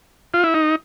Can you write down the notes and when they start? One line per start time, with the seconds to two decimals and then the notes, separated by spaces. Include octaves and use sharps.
0.34 F4
0.44 E4
0.54 D#4